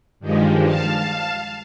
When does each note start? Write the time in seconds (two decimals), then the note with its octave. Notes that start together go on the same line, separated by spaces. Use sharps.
0.20 G2 D#3 F3 G3 G#3
0.65 F5 A5